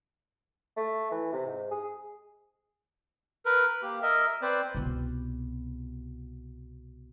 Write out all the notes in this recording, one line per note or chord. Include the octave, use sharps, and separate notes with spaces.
A3
E3
C3
G#2
G#4
A#4 B4
B5
A#3 G4
A#4 D#5 E5
C4 B4 C5 D5
C2 B2